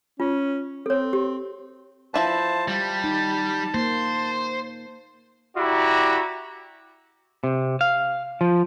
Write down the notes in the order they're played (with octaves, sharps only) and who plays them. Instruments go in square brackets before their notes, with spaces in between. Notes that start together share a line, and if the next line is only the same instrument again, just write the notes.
[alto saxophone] C#4 [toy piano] F4
[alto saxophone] C4 [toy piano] A4 C#5
[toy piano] G4
[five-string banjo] F3 E4 B4 [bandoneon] C5 A5
[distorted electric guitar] G3 [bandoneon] A5
[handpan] D#4
[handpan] A#3 [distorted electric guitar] C5
[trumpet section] E4 F#4 G4 D5 A#5
[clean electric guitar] C3
F5
F3